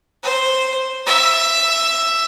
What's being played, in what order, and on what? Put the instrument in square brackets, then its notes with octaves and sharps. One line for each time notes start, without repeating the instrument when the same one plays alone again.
[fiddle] C5
E5